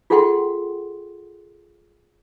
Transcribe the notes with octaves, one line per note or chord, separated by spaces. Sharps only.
F4 G#4 A4 F#5 G5 C6